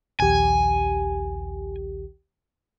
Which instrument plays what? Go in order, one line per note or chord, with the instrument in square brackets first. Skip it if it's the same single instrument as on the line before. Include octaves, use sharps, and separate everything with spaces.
[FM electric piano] A#1 D#2 G4 [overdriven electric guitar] G#5